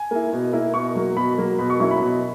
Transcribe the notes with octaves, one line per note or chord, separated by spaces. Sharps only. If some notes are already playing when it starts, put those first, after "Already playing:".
Already playing: G#5
A#3 E4
B2
A#3 E4
B2 C#6
F#3 A#3
B2 B5
F#3 A#3
B2 B5
C#6
F#3 A#3 C#4 E4 C#6
B5
B2